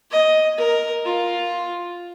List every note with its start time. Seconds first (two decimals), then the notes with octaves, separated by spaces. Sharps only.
0.11 D#5
0.57 A#4
1.05 F4